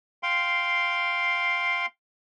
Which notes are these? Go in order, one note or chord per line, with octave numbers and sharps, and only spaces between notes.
F5 G5 C6